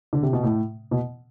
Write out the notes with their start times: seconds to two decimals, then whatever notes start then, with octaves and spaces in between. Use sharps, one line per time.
0.13 D3
0.23 C3
0.33 B2
0.43 A2
0.91 B2